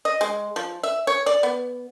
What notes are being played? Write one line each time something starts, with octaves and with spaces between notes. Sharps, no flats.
D#5
G#3
F3
E5
C#5
D5
B3